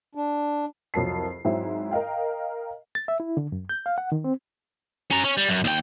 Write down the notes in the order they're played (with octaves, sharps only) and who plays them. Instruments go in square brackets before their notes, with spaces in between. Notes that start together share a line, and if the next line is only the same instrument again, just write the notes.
[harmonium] D4
[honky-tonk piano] C2 F2 F#3 A#4 A5 C7
G#2 F#3 C4 E4
A#4 D#5 F5 G5
[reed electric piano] A6
E5
E4
D3
F#2
G6
F5
F#5
D#3
C4
[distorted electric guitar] C#4 A#5
C#4
G3
F#2
D#2 G5